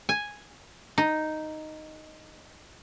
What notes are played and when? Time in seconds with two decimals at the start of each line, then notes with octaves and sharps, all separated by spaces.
0.09 G#5
0.98 D#4